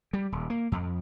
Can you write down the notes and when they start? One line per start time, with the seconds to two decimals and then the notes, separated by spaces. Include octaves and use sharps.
0.13 G3
0.32 D#1
0.50 A#3
0.72 F2